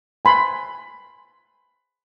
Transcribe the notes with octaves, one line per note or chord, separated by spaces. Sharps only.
G#5 B5 C6